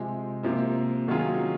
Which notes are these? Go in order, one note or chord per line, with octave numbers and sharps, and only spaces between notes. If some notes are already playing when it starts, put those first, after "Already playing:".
Already playing: C3 F3 G#3
C3 F3 A#3
D#3 F#3 C#4 F4 G#4